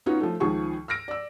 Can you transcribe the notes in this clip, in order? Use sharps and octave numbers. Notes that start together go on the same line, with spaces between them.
B3 C#4 D#4 F4 F#4 C#5
F3 A3
C#2 D#3 F3 G#4 C#6
E6 F6 A#6 D7
D5 E6